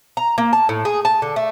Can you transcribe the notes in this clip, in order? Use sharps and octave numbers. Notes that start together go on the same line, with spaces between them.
A#5
A#3
A5
A2
G#4
A5
D3
A3